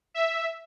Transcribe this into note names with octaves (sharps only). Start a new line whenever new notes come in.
E5